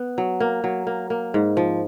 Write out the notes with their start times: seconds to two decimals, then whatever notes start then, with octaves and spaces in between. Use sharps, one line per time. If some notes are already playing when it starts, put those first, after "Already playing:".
Already playing: B3
0.18 F#3
0.40 A#3
0.64 F#3
0.87 A#3
1.10 A#3
1.34 G#2
1.57 F3